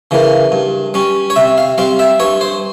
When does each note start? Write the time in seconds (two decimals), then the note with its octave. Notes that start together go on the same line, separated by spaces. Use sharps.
0.11 C#3 E3 A#3
0.52 G2
0.94 G3 C#4
1.30 C#5
1.36 C3 E5
1.58 F5
1.78 G3 C4 F5
1.99 E5
2.20 G2 C#5
2.41 C5